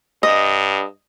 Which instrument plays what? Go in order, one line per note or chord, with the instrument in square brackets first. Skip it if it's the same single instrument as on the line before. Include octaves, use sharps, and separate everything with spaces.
[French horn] G2 [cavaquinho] D#5